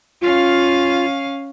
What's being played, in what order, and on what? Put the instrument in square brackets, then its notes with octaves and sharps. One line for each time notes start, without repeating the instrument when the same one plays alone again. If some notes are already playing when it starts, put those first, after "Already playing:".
[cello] C#4 F5 [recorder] F4